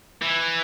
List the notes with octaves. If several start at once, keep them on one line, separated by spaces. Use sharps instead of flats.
E3